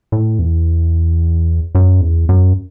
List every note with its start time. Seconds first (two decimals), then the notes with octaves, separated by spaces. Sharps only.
0.12 A2
0.39 E2
1.75 F#2
2.01 E2
2.29 F#2